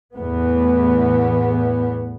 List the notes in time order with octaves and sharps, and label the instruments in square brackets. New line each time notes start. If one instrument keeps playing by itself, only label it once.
[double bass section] E2 A2 B3